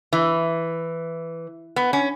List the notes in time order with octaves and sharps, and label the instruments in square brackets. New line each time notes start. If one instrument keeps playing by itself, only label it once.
[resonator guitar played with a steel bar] E3
B3
C#4